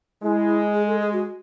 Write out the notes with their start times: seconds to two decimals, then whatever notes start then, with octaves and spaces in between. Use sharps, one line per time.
0.23 G#3 E4
0.74 G#4
0.87 A4
1.00 G#4
1.13 F#4